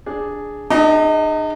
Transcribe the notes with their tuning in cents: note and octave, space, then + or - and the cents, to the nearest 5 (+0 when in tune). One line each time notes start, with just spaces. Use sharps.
D4 +0 G#4 +0
D#4 -45 G#4 -15 D#5 +20